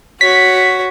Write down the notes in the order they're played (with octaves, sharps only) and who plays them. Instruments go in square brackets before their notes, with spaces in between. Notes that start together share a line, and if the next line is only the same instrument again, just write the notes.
[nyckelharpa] F#4 C#5 [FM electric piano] B6